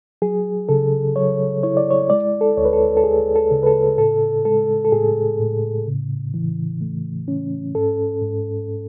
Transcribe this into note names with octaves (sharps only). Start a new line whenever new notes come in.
F#3 G#4
C#3 A4
F#3 C#5
E4 C#5
D5
C#5
G#3 D5
A4
D2 C#5
B4
A4
A4
D2 G#4
A4
C#3
B4
A4
A2 A4
G#3 A4
A4
A2 G#4
A2
C#3
E3
A3
C#4
G#2 A4
G#2